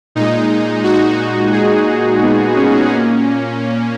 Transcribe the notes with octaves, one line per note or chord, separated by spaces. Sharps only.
A#2 G#3 D#4
F#4
G#4
D#4
B3
C#4
A#2 A#3 C#4